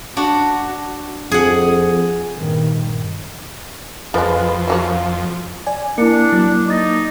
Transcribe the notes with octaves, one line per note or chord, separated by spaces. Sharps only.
D4 F#4
F2 G#4 F#5
G2 A#2 D#3
F2 F3 G#3 A4 B4
B4
F3 F#3 F#4
D5 G#5
A#3 D4 E4 C#7
F#3
D#4 D6 A6 A#6